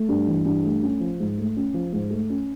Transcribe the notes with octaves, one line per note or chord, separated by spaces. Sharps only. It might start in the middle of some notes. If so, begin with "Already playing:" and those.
Already playing: A3
G2
E3
G2
A3
C#4
F3
G#2
A3
C#4
F3
G#2
A3
C#4